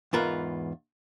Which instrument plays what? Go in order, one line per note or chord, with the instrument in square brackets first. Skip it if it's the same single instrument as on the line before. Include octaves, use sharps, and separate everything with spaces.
[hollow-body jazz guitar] E2 G#2 F4 A#4 B4